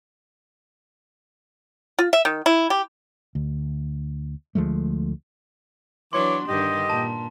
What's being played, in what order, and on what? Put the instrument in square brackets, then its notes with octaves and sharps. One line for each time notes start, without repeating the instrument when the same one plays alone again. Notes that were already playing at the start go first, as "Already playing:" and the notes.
[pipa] F4
E5
D#3
E4
G4
[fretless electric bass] D2
D2 F3 G#3 A3
[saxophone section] E3 C#5 [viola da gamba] F#3 D4 [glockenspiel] C6 [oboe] D6
[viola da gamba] G2 D3 D#3 [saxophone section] G4 [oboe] D#5
[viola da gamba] A#2 [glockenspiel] A5